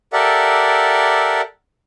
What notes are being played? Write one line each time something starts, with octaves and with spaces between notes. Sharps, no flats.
G4 A4 A#4 D5 E5 F#5